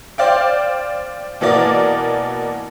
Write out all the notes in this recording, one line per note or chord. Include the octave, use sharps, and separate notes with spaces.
C5 D5 F5 G5
B2 E3 A#3 D5